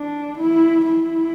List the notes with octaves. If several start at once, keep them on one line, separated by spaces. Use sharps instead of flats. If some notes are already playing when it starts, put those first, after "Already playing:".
Already playing: D4
E4
E4